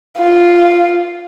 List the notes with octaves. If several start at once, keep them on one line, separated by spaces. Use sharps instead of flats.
F4